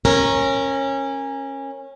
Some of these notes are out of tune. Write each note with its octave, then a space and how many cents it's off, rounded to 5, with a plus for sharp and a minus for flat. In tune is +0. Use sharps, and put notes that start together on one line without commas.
C#4 -20 A#4 +0